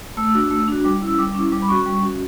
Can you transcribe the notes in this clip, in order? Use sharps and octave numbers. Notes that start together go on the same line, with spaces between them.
A3 E6
D4 F#4
A3
D4 F#4
G3 D6
C#4 E4 E6
G3 D6
C#4 E4
G3 D6
B5
C#4 F#4 C#6
G3
C#4 F#4